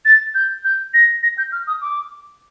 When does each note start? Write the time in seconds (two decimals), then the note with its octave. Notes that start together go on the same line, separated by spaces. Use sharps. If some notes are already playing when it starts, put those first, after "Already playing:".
0.05 A6
0.35 G6
0.65 G6
0.94 A#6
1.23 A#6
1.38 G6
1.52 F6
1.67 D#6
1.82 D6